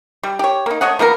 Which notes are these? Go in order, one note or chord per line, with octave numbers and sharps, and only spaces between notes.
G3
G4 C#5
A#3 D#4
A3 C#5 D#5 F#5
F3 A#3 B3 A#4